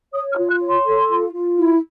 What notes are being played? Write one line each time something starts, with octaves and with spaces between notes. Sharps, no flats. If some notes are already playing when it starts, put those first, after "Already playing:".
C#5 D#6
F6
F4
F#6
C#5
C6
A4
F4
F4
E4